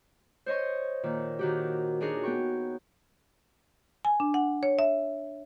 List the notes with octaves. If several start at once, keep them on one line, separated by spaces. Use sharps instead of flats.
C5 C#5 D#5 C#6
A#2 D#3
D#3 F#4 G4
D4 D#4 F#4 G#4 C#5
B3 G5 C#6
G#5
D4
F#5
C#5
E5